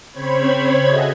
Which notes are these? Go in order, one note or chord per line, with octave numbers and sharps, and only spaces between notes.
C#3 C4 C5 C#5 B5 G#6
F#4 G#4 A4 D#5 E5